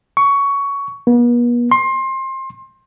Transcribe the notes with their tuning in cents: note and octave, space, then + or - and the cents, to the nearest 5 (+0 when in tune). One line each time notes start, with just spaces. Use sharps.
C#6 +15
B3 -45
C6 +25